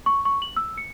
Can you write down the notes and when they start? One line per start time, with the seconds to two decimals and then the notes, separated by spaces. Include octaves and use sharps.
0.06 C#6
0.25 C#6
0.42 F#7
0.56 E6
0.78 C#7